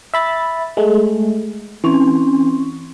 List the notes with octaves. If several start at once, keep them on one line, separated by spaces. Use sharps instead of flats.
E5 B5 A6
G#3 A3
E3 C4 C#4